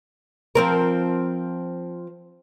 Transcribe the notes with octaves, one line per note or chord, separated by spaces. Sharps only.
F3 C4 A#4